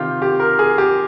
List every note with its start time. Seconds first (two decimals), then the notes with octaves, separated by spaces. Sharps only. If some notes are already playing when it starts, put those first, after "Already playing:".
Already playing: C3 D#3 F4 G4
0.22 G4
0.40 A#4
0.59 G#4
0.78 G4